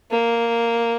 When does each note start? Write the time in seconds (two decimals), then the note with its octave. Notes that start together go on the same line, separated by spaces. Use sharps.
0.11 A#3